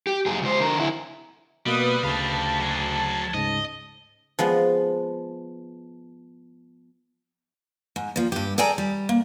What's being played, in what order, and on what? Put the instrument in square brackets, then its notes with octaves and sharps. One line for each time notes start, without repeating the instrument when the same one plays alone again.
[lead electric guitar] G4
F#2 G#4
C#2 C5
D3 A#4
D2 E4
[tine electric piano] B2 A#3 [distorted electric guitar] G3 [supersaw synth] B4 D#6
[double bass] D2 [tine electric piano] C#3 B5 [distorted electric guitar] G4 F5 [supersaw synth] A5
[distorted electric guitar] F#3 G#4
[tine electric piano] G#2 C#3 [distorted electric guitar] D#5
[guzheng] F3 G#3 B3
[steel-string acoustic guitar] G#2
A#2 F3
G2 G4
G#4 A4 D5 G5 G#5 A#5
G3
A#3